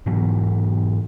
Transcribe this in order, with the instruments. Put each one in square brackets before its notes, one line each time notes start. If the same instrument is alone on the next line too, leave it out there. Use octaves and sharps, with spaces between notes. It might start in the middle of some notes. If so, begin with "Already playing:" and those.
[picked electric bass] G#2 E3 F#3 B3